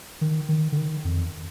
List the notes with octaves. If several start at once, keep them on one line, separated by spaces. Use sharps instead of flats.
D#3
D#3
D3
D#3
F2